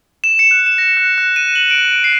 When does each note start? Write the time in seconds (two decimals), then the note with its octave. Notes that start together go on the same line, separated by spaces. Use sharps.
0.24 E7
0.39 C#7
0.51 F#6
0.66 E7
0.78 A#6
0.97 F#6
1.18 F#6
1.36 D#7
1.56 F#7
1.70 D7
1.91 D7
2.04 C7